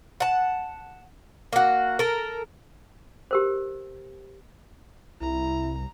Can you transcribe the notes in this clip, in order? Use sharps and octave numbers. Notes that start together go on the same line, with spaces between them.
F#5 A5
A#3 F#4
A4 A#4
G4 A#4 C5
C2 E4 A#5